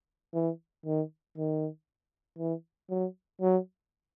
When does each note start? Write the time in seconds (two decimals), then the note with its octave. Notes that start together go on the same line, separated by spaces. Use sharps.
0.34 E3
0.86 D#3
1.37 D#3
2.38 E3
2.90 F#3
3.41 F#3